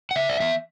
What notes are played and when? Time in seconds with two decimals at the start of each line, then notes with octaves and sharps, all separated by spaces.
0.11 F#5
0.15 C#3 E5
0.29 D5
0.40 E3 B3 E5